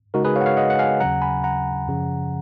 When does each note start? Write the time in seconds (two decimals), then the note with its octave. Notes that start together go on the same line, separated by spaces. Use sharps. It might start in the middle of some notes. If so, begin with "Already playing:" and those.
0.14 C#3 G#3 D#4 F#4 A#4
0.25 G#4 B4
0.36 C#5 F5
0.41 F#5
0.46 C#5 F5
0.57 D#5 F#5
0.70 F#5
0.79 F5 G#5
1.00 D#2 C#3 F#3 F#5 A#5
1.22 G#5 B5
1.44 F#5 A#5
1.87 F#2 C#3 F3